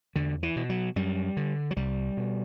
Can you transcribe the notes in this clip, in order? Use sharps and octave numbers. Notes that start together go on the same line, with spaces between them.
E2 D3
E3
B2
F#3
F#2 G3
D3
F#3
C2 G3
B2